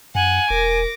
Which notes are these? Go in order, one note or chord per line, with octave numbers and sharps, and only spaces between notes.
F#2 F#5 G#5
E1 A#4 D6 A#6